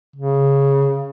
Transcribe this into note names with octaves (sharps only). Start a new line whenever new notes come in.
C#3